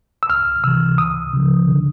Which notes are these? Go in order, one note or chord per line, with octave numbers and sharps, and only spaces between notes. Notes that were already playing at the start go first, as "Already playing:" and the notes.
E6
C#2 F6
C3 E3 E6
C#2 D#6
C#3 F3
D3